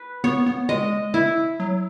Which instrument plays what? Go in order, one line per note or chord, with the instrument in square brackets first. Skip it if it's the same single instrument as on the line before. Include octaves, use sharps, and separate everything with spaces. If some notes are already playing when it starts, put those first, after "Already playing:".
Already playing: [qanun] B4
[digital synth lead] B3 [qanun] C#5
[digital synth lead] B3
[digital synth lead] G#3 [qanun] D#5
[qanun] E4
[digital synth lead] F#3